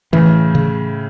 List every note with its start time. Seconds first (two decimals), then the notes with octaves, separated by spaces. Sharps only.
0.13 A2 C#3 E3
0.55 C#3